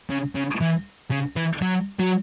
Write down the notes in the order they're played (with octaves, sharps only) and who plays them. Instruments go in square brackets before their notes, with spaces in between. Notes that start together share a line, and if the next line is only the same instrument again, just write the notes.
[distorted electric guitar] C#3
C#3
E3
C#3
E3
F#3
F#3